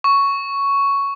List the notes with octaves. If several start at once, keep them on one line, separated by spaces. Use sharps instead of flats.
C#6